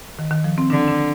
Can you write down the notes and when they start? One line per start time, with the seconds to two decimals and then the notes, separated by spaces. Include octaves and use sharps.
0.19 D#3
0.31 D#3
0.44 F3
0.58 C4
0.70 D3 D4
0.88 D4